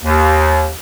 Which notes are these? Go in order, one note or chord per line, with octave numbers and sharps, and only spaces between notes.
D#2